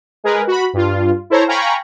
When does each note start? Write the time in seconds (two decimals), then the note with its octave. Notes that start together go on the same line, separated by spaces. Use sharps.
0.24 G#3 G#4 A#4 B4
0.47 F#4 B5
0.73 G2 F4
1.30 E4 A4 C5 C#5 A#5
1.48 F5 G5 G#5 A#5 B5 C#6